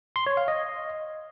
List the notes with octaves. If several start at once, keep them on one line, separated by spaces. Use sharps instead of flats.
C6
C#5
F5
D#5